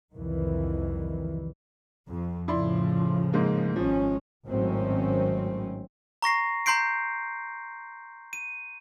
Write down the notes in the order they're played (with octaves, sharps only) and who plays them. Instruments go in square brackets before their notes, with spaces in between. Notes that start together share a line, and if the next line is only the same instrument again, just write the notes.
[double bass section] C2 F2 D#3 E3
F2
[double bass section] A2 C#3 F3 [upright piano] E4 D5 C6
[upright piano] G#2 G#3 A#3
[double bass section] G#1 G#3 C#4 [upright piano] F3
[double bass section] G#1 A2 D#3 F#3 C4 C#4
[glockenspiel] A#5 C#6 A#6 C7
A#5 C6 G6 C7 D7
D#7